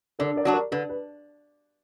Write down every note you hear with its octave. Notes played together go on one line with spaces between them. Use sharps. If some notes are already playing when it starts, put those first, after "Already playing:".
D3 A#4 D5
A#4 D5
F#3 D4 F#4
A#4 D5
D3 B4
B4